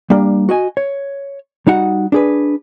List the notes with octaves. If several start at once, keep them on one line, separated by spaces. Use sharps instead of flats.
G3 A#3 D4
F#4 D#5 G#5
C#5
G3 D#4 F#4 F#5
D4 G#4 B4